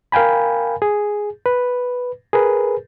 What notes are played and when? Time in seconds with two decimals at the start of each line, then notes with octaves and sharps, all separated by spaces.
0.12 A#4 F5 G5 G#5 B5
0.82 G#4
1.46 B4
2.33 G#4 A#4 B4